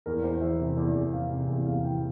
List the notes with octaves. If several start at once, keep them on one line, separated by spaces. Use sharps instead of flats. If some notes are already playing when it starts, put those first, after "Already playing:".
E2 A#4
E2 C5
E3 E5
C3
E2
E2
E3 F5
C3
E2
E2 F5
E3 G5